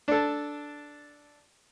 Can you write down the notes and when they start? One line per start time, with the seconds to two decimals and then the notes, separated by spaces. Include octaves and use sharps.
0.08 D4 A4